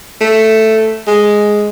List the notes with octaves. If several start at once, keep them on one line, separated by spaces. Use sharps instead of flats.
A3
G#3